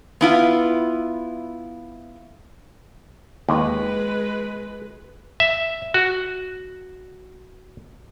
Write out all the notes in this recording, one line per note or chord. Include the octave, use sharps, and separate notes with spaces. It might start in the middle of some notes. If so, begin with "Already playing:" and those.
B3 E4 F4
D#2 G#3 B4
E5
F#4